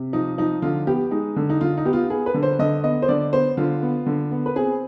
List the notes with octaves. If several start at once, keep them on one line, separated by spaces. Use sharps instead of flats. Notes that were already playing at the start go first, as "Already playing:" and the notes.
Already playing: C3
F3 D#4
F3 D#4
D3 F4
B3 G4
G#3 D#4
D3
D#4
D3 F4
D#4
B3 G4
F4
B3 G#4
B4
D3
C5
D3 D#5
B3 D#5
C5
D3 D5
B3 C5
D3 F4
B3
D3
B3
B4
C4 G#4